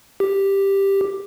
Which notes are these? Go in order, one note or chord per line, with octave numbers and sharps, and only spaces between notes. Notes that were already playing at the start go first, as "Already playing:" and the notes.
G4